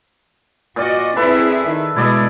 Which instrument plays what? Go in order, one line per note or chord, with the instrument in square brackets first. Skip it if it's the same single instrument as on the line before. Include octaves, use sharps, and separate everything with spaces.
[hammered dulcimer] A#2 D5 [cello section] F#4 D#5
[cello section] C4 E4 G#4 [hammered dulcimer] A4 B4 E5
[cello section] D#3
[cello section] B2 G#3 [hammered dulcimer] E4 D5 D#5